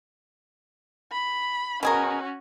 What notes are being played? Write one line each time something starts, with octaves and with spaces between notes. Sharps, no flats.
B5
B2 C#4 F#4 G#4 A#4